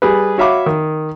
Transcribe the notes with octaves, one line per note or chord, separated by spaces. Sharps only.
G3 G#4 B4
F#4 C#5 E5 F5 B5 D6
D#3